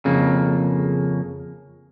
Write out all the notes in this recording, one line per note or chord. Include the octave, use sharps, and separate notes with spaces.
F2 C#3 A#3